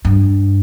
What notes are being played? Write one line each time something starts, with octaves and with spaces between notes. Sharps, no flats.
G2